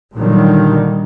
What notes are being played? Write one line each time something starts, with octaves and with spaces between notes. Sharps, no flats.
A#2 D3 D#3 F#3 G3